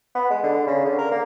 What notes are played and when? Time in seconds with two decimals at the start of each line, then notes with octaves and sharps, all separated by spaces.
0.15 B3
0.31 G#3
0.43 D3
0.67 C#3
0.85 D3
0.98 A#4
1.11 A#3